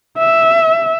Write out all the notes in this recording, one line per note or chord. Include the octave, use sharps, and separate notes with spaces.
E5